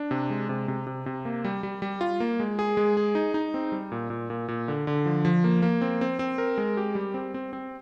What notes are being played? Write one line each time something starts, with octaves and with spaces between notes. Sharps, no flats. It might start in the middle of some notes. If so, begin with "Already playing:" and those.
Already playing: D4
C3
G#3
C3
C3
C3
C3
A#3
G3
G3
G3
F4
A#3
G#3
G#4
G#3
G#4
D#4
D#4
C4
G3
A#2
A#2
A#2
A#2
D3
D3
F3
F3
A#3
A#3
C4
C4
C4
A#4
G#3
G4
G3
C4
C4
C4